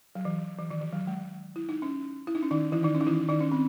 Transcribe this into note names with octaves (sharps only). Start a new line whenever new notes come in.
F#3
E3
E3
D#3
E3
F#3
G#3
E4
D#4
C#4
E4
D#4
C#4
D#3 D#4
E3 E4
D#3 D#4
C#4
D#4
E3 E4
D#3 D#4
C#4
C4